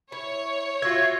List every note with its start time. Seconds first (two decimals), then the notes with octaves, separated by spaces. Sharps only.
0.12 E4 C#5
0.82 F4 F#4 E5 G#6